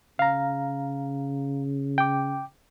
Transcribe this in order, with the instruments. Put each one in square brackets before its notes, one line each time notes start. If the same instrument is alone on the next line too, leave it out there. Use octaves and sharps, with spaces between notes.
[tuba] C#3 [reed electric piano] F5 A#5
[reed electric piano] G5 D6